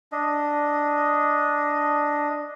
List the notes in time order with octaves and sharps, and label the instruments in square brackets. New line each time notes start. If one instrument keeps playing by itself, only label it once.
[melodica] D4 D#5